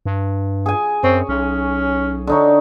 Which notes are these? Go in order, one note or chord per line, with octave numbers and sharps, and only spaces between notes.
G2
G#4 G#5
F#2 C4 C#5
B1 C#4
D3 D#4 C#5